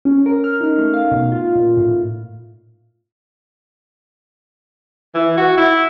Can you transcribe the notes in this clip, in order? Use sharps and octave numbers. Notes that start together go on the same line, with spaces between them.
C#4
A#4
F6
D#4
A3
F5
B2
F4
A#2
A2
E3
F#4
E4